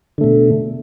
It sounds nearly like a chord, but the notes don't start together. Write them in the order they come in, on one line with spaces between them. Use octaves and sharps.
D3 A3 B2